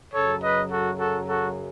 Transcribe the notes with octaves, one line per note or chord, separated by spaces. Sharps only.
F#2 C#3 F#3 A4 C#5
B4 D#5
F#4 A4
F#4 A4
F#4 A4